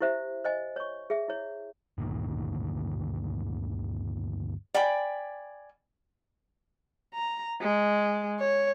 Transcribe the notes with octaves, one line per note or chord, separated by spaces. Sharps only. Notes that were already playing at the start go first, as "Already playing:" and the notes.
E4 G4 C5 E5
C5 D#5 G#5
C#5 C#6
G#4 E5
E4 C#5
G1 D2 A#2 D#3
D5 G5 G#5 B5
A#5
G#3
C#5